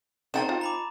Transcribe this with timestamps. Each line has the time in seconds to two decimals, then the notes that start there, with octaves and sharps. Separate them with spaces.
0.34 C4 D#4 D5 F#5 G5 A5 A6 E7
0.49 F4
0.61 A#5 B5 D6